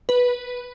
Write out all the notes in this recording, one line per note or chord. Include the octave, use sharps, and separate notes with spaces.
B4